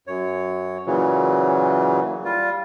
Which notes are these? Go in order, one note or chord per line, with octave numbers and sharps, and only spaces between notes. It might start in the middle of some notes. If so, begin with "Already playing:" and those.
F#2 C#5
A#2 C#3 E3 F#3
G3 F4